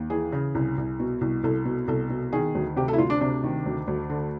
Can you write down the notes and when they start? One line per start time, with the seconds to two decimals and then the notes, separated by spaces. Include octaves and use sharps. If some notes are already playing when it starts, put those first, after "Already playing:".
Already playing: D#2
0.10 E3 G#4
0.32 C#3
0.55 C2
0.78 C2
1.00 B2
1.21 C2
1.44 C2 A4
1.65 B2
1.88 C2 A4
2.10 B2
2.32 D#3 G#4
2.55 D2
2.77 C3 G4
2.88 A4
2.93 E4
2.98 D2 F4
3.10 D4
3.21 C3 D4
3.44 D#3
3.66 D2
3.88 D2
4.10 D3